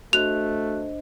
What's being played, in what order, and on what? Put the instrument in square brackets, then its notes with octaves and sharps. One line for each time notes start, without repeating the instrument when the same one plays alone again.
[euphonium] A3 [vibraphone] D4 C5 D#5 [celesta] F#4 F#6 [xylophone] F7